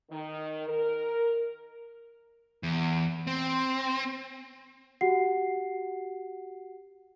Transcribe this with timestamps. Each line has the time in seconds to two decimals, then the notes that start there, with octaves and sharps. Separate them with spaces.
0.11 D#3
0.68 A#4
2.63 E2
3.27 C4
5.01 F#4 G4 F#5 C7